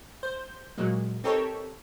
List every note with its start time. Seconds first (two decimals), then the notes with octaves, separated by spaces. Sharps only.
0.23 C5 G6
0.78 A#2 F#3 G#3 A#3
1.24 C4 D#4 G4 A4 A#4 C#5